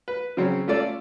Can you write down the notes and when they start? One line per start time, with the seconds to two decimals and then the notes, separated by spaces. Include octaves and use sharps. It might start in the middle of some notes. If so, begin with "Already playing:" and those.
0.08 B4
0.37 C#3 F#3 C4 C#4
0.68 A3 C#4 F4 A4 D5